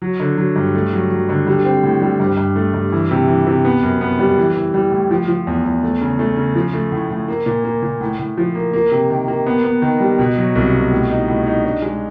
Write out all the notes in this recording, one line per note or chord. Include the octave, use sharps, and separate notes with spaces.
F#3
D3
F#3
G2
A3
F#3
F#3
D3
G3
C4
A2
G3
G2
G2
A3
G2
E3
C3
E3
C3
B3
F#2
B3
G3
E3
E3
G3
A2
F3
F3
E2
E2
A3
C#3
A3
C#3
F3
A3
A2
A2
A#3
A#2
A#3
A#2
A2
A2
F3
A#3
A#3
C3
D#3
A#3
B3
B3
D#3
G3
B2
F#3
C2
B2
A2
D#4
A2
D#4
D4
G#3